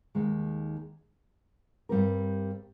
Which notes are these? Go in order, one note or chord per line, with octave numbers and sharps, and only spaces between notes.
D#2 D#3 G#3
G2 G3 C4 G4 A#4